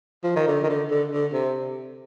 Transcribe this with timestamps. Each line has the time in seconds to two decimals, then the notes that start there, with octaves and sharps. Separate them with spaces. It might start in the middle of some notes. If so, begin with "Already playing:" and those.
0.24 F3
0.36 D#3
0.48 D3
0.63 D#3
0.69 D3
0.91 D3
1.12 D3
1.33 C3